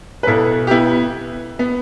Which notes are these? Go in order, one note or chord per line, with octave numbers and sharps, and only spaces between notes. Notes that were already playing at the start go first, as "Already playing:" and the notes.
B4
B1 B2 E4 A4
G4
B3 E4
B3